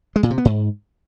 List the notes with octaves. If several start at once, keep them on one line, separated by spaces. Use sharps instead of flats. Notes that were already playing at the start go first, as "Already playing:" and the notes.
G#3
A#2
C3
B3
G#2